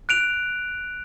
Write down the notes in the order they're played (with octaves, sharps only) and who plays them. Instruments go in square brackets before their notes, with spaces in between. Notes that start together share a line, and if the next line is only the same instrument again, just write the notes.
[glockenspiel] F#6 D7 F7